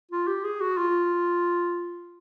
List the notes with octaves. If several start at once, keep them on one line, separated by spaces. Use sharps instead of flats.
F4
G4
G#4
F#4
F4